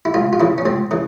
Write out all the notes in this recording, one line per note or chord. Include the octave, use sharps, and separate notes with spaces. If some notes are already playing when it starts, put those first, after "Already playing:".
E4
C#2 F4
F4
C#3 E3 E4
C#4
C#2 C4
C#3 E3